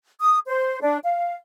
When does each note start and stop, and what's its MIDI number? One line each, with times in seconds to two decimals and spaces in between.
0.20 0.38 87
0.47 0.79 72
0.81 0.98 62
1.04 1.35 77